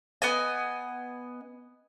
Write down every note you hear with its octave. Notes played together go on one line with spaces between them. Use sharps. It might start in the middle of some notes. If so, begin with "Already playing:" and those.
B3 D#5 G#5